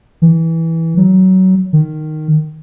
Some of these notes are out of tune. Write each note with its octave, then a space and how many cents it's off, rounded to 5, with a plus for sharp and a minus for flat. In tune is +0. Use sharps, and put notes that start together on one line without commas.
E3 -10
F#3 +20
D#3 -10